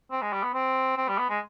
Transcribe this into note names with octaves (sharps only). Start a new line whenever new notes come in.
C4
G#3
G3
B3
C4
C4
G3
B3
G#3